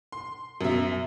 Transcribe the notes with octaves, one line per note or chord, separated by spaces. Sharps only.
C6
F#2 B2 E5